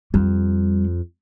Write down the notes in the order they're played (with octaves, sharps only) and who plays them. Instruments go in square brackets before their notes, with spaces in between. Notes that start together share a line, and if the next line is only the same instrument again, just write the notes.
[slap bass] F2 [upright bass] G3